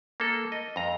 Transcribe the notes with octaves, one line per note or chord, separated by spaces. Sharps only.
A#3 A4
D#5
F2 A#5